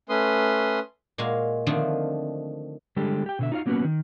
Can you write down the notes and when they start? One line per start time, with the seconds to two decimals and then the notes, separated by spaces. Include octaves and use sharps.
0.09 A3 C#4 B4 C6 D#6
1.18 A#2 G#3 F#4 F5
1.66 D3 D#3 F3 A3 C4
2.96 D3 G3 G#3 G4 A4
3.26 G4 G5
3.39 B2 D3 E5
3.52 D#4 F4 F#4 D#5 F5
3.66 F#3 A#3 B3 C#4 F#4 B4
3.85 D#3